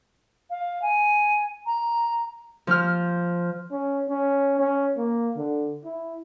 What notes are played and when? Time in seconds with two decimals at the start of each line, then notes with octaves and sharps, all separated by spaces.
0.50 F5
0.82 G#5
1.66 A#5
2.67 F3 F6
3.71 C#4
4.09 C#4
4.59 C#4
4.97 A#3
5.37 D3
5.85 E4